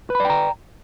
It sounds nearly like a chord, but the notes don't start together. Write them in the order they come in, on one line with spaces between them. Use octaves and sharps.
B4 B5 D5 G5 A#5